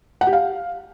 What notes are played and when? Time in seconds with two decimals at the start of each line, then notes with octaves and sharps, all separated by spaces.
0.21 F#5
0.27 G4
0.33 F5